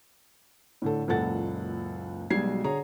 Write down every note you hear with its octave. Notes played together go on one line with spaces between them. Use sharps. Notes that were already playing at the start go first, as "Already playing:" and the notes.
A2 D3 A4
F#1 C#2 A#2 A4 F#5 A6
B1 B2 G3 G#3 G#6 C7
D3 G#4 C#5 A#5